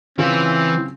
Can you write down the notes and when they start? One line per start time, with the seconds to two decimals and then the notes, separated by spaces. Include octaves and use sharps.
0.18 C#3 E3 C4 C#4 F4